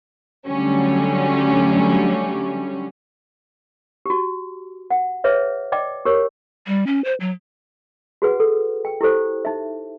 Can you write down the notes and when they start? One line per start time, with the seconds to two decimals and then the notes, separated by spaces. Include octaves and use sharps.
0.47 D3 F#3 G3 A3 C#4
4.06 F#4 G4
4.90 F#5
5.24 G#4 B4 C#5 D#5 E5
5.72 D5 D#5 G5 D6
6.05 G4 A#4 C#5
6.67 G3
6.87 C#4
7.05 C5
7.20 F#3
8.22 F#4 G#4 B4 F#5
8.40 A4
8.85 G5
9.01 E4 G4 A4 C5
9.45 D#4 E5